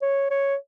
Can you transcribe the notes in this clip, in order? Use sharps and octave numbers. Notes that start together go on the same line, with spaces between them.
C#5
C#5